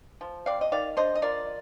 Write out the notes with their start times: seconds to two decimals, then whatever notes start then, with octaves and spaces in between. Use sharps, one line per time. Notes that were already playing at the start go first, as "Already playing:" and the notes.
0.21 F3
0.46 C4 D5 F5
0.61 D#5
0.72 D#3 D5 F5
0.97 D4 C5 D#5
1.15 D#5
1.22 F4 A#4 D5